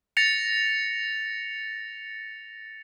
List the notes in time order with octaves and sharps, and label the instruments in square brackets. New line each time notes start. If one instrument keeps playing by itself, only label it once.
[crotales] A6 A#6 C#7 F7